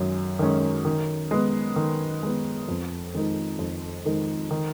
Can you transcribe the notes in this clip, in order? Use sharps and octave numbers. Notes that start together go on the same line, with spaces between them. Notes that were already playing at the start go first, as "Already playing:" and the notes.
Already playing: F#2 D#3 G#3
D#3 G#3 C#4
D#3
G#3 B3
D#3
G#3 B3
F2
D#3 G#3 D#4 A#4
F2
D#3 G#3 D#4 A#4
D#3